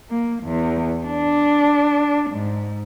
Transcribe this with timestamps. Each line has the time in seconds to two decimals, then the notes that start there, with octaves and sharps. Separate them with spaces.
0.10 A#3
0.43 E2
1.06 D4
2.30 G#2